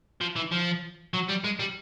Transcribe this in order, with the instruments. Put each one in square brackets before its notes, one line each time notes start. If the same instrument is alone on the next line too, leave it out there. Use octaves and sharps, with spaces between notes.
[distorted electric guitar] F3
E3
F3
F#3
G3
G#3
G3